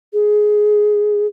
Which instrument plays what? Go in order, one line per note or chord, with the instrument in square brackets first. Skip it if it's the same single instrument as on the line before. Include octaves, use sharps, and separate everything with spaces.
[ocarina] G#4